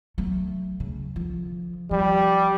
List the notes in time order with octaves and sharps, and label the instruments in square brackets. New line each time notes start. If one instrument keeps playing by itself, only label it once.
[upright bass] F#3 A3
C#3
D3 F3
[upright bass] F3 [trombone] G3